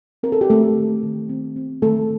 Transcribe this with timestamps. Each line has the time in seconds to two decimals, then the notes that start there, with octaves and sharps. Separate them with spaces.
0.23 C4 A#4
0.32 A4
0.41 G4
0.50 A3 C4 A4
0.77 D#3
1.03 D#3
1.29 C4
1.56 C4
1.82 D#3 A3 A4